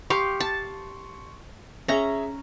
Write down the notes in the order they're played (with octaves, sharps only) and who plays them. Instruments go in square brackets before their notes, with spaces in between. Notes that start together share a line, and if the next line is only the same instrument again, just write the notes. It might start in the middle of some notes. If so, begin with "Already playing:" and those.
[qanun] G4 F5 [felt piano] C6 C#6
[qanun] A5
[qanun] C#4 A#5 [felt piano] G#4 E5